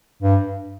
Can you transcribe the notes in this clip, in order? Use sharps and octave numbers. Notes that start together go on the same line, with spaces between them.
G2